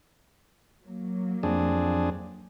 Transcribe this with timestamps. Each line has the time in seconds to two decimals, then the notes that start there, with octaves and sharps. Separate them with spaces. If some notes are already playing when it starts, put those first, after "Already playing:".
0.84 F#3 A#3
1.43 F2 D4 G#4